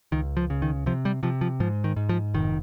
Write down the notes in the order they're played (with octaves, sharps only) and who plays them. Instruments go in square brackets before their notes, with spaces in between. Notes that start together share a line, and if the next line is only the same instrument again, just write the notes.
[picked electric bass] C#2 D#3
F3
C#3
D#3
C3 F3
G3
C3 F3
F3
G#2 F3
D#3
G#2
F3
F1 D#3